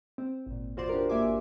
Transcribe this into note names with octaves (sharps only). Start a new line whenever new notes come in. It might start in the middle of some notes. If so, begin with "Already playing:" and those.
C4
G#1 A#2
E2 F4 F#4 C5 D5 C6
D4 G4 A#4
G1 A#3 E5 G#5 D6